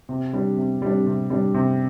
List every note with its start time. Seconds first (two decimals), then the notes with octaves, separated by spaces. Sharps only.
0.09 C3
0.33 G3 D4
0.58 C3
0.82 G3 D4
1.07 C3
1.30 G3 D4
1.55 C3